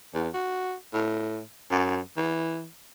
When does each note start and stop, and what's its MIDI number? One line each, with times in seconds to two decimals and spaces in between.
0.14 0.29 40
0.34 0.75 66
0.94 1.41 45
1.71 2.00 42
2.17 2.67 52